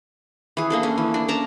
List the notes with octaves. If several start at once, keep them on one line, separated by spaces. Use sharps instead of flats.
E3 G#4
A#3 D4 A4
C#4
E3
D4
C#4 A5 A#5 D6